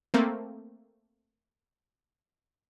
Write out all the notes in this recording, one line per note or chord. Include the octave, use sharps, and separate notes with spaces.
A3 A#3 C4